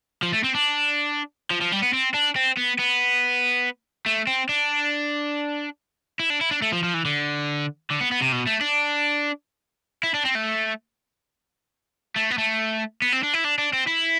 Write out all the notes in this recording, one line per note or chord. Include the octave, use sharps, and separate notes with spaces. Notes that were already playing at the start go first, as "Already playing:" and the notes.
F3
A3
C4
D4
F3
F3
G3
B3
C4
D4
C4
B3
B3
A3
C4
D4
E4
D4
E4
D4
A3
F3
F3
E3
D3
D3
B3
B3
C3
B2
A3
D4
E4
D4
C4
A3
A3
B3
A3
B3
C4
D4
E4
D4
D4
C4
E4